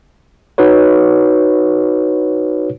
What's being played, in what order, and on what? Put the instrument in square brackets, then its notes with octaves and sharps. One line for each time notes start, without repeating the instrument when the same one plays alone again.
[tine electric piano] D#4 F#4 B4 C#5